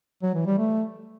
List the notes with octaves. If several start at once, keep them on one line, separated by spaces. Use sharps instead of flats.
F#3
E3
G3
A3